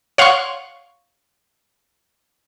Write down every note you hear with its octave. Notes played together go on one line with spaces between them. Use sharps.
C#5 F5 F#5 C6 C#6